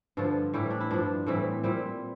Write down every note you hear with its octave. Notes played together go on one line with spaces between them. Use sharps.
G2 D3 F3 F4 A4
A2 E3 G3 E4 G4
D4
E4
G2 F3 D4 F4
A2 E3 G3 C4 E4
A#2 G3 C4 E4